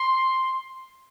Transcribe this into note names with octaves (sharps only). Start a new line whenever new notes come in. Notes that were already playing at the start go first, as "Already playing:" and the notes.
Already playing: C6